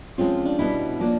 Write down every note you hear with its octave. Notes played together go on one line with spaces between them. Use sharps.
F3 G#3 C4 C#4 F4
D4
B2 G3 B3 D#4 E4
F3 A#3 D4